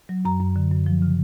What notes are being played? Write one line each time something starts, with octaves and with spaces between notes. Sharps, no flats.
F#3
F#2 A#5
F#2
D3
F#2
F3
C#3